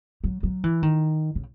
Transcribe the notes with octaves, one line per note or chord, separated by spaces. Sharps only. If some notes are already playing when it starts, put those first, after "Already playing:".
F#3
F#3
E3
D#3
C#3